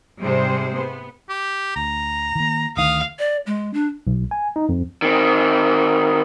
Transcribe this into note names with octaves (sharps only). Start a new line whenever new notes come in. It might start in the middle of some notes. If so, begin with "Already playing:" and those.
G#2 C3 G3 G#4 C5
B3
G4
D2 A#5
D#3 A#3
D2 D#3 F5 D#6
D5
G#3
D4
B1
G#5
D#4
F2
D#3 C4